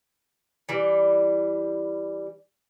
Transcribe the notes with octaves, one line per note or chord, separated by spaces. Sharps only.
E3 G3